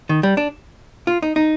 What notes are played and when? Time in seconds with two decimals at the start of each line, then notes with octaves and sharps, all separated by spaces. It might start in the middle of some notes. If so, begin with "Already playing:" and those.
0.09 D#3
0.23 G3
0.37 D4
1.07 F4
1.23 D#4
1.36 D#4